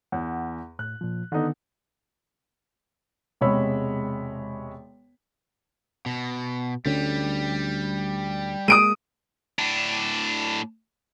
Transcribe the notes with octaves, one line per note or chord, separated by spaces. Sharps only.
E2 F#5
A2 F#6
A#2 F3
D3 D#3 B3 D#4
E1 C3 G#3 C#5 B5 E6
B2
D2 D3 G3 C#4
G#3 A#3 D#6 D7 D#7
A2 D4